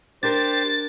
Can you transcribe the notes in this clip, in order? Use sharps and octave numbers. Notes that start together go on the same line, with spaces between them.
D4 G4 A#4 C5 A6